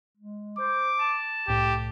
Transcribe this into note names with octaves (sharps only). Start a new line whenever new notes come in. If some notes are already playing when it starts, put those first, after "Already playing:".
G#3
C5 D6
A5
C2 A2 G4